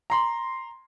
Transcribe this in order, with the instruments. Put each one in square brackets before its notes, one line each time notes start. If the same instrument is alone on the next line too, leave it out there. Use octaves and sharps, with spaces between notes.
[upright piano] A#5 C6